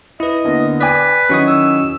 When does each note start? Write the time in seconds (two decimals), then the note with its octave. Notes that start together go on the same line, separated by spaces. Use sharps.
0.20 E4 B4 D#5
0.45 D3 A#3 B3
0.81 B4 D5 G5 G#5 D6 B6
1.30 D#3 F#3 C#4 E4 C#6 D#6
1.48 E6